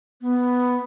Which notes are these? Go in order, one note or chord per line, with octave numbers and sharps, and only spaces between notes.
B3